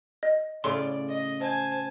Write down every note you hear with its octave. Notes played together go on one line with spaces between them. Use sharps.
D#5
A2 C#3 F4 D5 C6
D#5
C5 G#5 A5